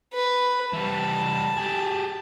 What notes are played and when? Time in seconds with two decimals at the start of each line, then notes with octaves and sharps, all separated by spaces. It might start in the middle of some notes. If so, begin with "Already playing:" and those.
0.14 B4
0.74 E3 G3 A5
1.57 G4 G#4